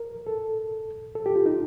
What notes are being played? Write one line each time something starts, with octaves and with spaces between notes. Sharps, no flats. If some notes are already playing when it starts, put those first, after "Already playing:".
Already playing: A#4
A4
A4
G4
F4
D#4